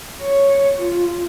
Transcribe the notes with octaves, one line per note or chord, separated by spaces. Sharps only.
C#5
F4